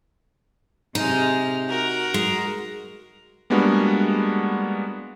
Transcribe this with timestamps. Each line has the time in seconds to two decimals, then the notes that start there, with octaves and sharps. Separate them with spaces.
0.95 C3 G#3 D#4 F6
1.68 F#4 A#4
2.14 G#3
3.50 G3 G#3 A#3 B3 D4 F#4